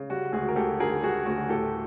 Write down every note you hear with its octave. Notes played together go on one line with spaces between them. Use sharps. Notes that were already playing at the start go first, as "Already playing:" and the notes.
Already playing: C#3
G3 F#4
D2 F#4 G#4
A#4
D2 G4 A4
D3 G#4 A#4
G3 F#4 G#4
D2 F#4 G#4
A2 G4 A4